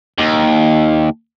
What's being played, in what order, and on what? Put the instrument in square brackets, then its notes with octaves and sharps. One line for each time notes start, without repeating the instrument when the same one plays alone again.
[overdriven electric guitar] D#2